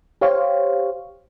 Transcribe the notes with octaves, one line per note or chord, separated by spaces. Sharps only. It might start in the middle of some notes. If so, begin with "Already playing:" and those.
G4 C5 C#5 F5